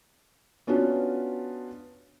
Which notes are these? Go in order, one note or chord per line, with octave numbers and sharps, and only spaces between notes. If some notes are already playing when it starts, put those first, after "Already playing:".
B3 C#4 D4 F4 F#4